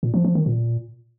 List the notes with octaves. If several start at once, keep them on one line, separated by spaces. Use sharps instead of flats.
A#2
F3
F3
D#3
A#2